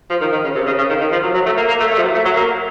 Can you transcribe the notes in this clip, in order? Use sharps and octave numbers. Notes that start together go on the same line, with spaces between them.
F3
D#3
D#3
C#3
C3
C#3
C#3
D#3
D#3
F3
F#3
F#3
A3
A#3
A#3
A3
A3
F3
F#3
A3
F#3
A#3